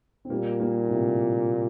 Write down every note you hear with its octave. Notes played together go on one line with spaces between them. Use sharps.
C4
A#2 G3 A#3
G3 A#3
A2 C3